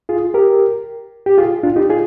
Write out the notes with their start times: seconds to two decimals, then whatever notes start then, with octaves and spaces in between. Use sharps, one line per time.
0.09 F4 G#4
0.34 G4 A#4
1.26 G4
1.38 F4 G#4
1.63 D4 F4
1.76 D#4 G4
1.89 F4 G#4